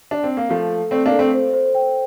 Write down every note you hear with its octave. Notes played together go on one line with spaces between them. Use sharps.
D4
C4
A#3
F3 A3 A4
A4
A3 C4 D5
A#3 D4
A4
A3 C4
C5
C5
G5